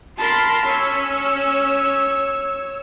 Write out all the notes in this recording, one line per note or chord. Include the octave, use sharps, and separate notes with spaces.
A#4 A5 B5 C6 B6
C#4 C#5 E6